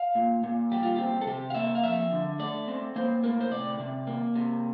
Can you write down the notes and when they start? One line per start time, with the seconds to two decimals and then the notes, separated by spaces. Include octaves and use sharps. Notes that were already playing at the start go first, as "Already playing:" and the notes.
Already playing: F5
0.15 A#2
0.44 A#2
0.72 G3 G4
0.83 F4
0.96 C4 G4
1.21 A4
1.26 C3 G4
1.50 F5
1.55 A#3 E5
1.75 F5
1.83 F2 E5
2.11 D3
2.39 A3 D5
2.68 C4
2.96 A#3 C5
3.23 A2 A#4
3.41 C5
3.51 C3 D5
3.80 C3
4.07 A#3
4.35 C3